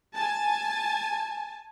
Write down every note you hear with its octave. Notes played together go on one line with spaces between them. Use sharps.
G#5 A5